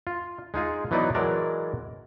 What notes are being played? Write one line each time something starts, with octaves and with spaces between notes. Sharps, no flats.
F4
G#3 D#4 F4 G#4
E3 F#3 B3 D#4 E4 D5
E3 F#3 G#3 A#4 D5 A5